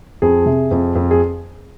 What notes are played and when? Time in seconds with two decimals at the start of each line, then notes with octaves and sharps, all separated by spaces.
0.22 F2 G#4
0.46 C3
0.71 F2
0.95 F2
1.11 G#4